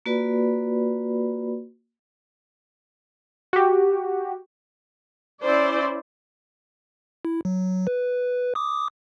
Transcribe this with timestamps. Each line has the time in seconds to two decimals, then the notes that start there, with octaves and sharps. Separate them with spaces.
0.06 A#3 F4 F#4 B4 D5 B5
3.53 F#4 G4
5.42 C#4 E4 C5 D5
7.25 E4
7.45 F#3
7.87 B4
8.55 D6 D#6